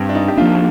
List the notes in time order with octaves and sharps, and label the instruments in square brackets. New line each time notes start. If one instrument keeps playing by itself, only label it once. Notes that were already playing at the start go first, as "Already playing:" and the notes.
Already playing: [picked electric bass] G2 [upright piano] C4
[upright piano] D4
D#4
G4
[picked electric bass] F3 A#3 D4 [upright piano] F4